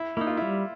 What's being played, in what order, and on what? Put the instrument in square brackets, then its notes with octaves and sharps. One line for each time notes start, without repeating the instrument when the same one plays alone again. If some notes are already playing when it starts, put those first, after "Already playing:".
Already playing: [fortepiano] E4
[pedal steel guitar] A#3 D#4 [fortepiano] E4
[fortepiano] F4
[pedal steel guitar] G3 [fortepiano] E4